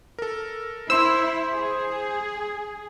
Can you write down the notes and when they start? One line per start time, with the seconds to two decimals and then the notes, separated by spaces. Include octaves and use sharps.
0.18 A4 A#4
0.90 E4 C5 C6 E6 E7
1.54 G#4